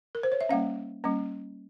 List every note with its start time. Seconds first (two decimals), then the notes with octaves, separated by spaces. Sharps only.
0.15 A#4
0.23 C5
0.32 C#5
0.41 E5
0.49 G3 A#3 C#4 F5
1.04 G3 A#3 C#4